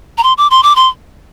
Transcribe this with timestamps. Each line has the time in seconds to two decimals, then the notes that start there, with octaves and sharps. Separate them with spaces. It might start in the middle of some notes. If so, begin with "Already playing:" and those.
0.18 A#5
0.23 C6
0.38 D6
0.51 C6
0.63 D6
0.76 C6